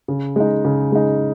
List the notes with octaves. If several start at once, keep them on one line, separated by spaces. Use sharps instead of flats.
C#3
G#3 D#4
C#3
G#3 D#4